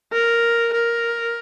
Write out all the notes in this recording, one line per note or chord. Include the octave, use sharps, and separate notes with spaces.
A#4
A#4